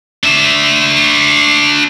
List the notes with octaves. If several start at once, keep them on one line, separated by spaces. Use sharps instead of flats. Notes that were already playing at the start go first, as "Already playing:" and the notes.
D4 E5